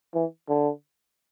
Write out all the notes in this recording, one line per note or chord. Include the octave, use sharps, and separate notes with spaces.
E3
D3